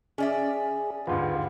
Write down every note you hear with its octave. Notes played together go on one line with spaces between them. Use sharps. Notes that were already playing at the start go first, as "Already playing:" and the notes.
C#4 G#4 D5 E5
D#2 G#2 D3 F4 B4